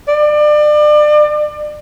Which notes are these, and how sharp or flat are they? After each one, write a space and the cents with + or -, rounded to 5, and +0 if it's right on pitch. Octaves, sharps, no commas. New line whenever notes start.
D5 +30